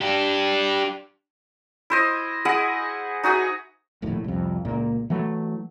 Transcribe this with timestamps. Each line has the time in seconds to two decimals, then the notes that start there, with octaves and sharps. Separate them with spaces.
0.01 D4 G4
1.90 E4 C5 D#5
2.45 E4 G#4 D#5 F#5
3.24 D#4 F#4 G#4 E5
4.02 D1 A#1 D#2 A2
4.24 C2 F2
4.65 C#2 A#2 A#3
5.10 E3 F#3 A3